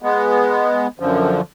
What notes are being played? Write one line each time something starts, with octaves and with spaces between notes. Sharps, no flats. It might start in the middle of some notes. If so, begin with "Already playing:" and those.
G#3 B3
F#2 D3 F3